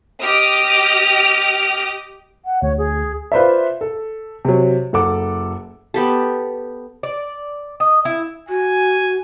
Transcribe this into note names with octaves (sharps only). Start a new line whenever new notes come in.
G4 D#5 D6 D#6 F6
F#5
D2 C#5
G#4
F4 B4 C5 D5 E5
A4
C3 F#3
F#1 A4 F#5 D6
B3 G4 A4
D5
D#5
E4
F#4 G#5